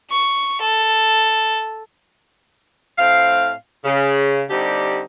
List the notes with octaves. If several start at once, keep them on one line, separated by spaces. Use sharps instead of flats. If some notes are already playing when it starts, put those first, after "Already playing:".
C#6
A4
A2 C4 F5
C#3
D3 G3 C4 D#4 G4